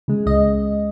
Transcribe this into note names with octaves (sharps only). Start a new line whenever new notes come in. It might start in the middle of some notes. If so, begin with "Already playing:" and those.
C#3 G#3
C#2 D#5